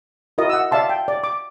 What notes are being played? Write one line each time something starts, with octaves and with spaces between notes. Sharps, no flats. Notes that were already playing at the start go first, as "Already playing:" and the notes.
E4 F#4 A#4 D#5
F#5 E6
D5 E5 F5 A5 C6
G5
D5
D6